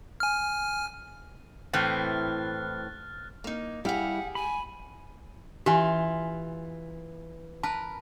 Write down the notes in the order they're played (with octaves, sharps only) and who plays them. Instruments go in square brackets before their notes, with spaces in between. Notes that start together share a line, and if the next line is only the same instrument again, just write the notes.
[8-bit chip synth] G#5 F6
[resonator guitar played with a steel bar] A2 E3 C4 [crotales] F6 F#6 A6
[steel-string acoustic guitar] A#3 D#4
[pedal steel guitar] G3 E4 F5 [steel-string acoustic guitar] G4 G#4 [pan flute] F#5
[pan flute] G#5 [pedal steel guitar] B5
[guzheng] E3 F4 [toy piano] G4 G#5
[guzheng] A#4 B4 [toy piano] A5